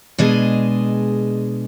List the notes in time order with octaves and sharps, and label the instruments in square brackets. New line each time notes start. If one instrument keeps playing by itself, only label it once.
[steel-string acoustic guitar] B2 G#3 D4 G#4 D#5